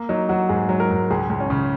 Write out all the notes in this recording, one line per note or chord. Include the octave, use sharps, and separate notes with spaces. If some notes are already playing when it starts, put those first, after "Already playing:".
Already playing: A#3
F#3 D#4
F#3 F#4
G#2 G#4
F#3
A#4
G#2
C#2 G#4
C#2
C#4
C#3